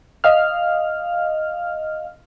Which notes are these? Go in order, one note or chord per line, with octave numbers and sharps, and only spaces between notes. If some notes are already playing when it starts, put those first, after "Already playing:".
D#5 F5 F6